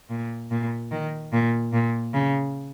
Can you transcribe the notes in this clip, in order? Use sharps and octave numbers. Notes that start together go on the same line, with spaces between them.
A#2
A#2
D#3
A#2
A#2
C#3